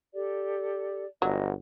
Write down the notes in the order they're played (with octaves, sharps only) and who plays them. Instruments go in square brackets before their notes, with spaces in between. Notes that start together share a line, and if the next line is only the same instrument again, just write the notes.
[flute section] G4 A4 D5
[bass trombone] G1 [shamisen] F#3 [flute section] D#5